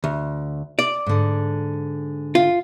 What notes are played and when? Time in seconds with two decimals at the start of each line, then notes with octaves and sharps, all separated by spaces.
0.04 D2
0.79 D5
1.06 G#2 D3
2.35 F4